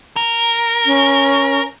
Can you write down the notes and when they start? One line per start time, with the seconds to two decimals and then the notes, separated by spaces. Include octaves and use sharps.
0.16 A#4
0.86 C#4